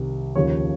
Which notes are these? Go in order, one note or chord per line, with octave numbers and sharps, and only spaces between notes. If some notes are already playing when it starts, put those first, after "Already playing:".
Already playing: C2 C3 D#3
D#2 C#3 F3 C#5